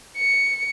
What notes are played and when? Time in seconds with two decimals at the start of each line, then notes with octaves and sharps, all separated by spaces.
0.17 C#7